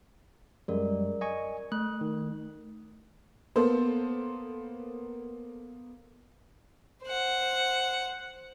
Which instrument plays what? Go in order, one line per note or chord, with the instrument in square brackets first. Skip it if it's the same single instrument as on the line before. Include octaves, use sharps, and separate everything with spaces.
[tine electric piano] F#2 G3 G#3 [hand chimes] A#4 D5
[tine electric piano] D#5 G#5 C#6
[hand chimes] A3 [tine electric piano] F#6
[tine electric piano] D#3
[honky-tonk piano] A#3 B3 A4 C5
[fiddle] C5 F#5